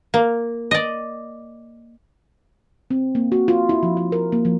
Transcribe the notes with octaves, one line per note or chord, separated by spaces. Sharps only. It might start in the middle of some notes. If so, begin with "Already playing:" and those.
A#3
D5 D#5
C4
A#3
F#4
F4
E4
F3
E4
A#4
A#3
F3